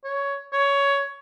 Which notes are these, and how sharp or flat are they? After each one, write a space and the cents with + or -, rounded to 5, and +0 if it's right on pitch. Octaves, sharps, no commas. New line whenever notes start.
C#5 +10
C#5 +15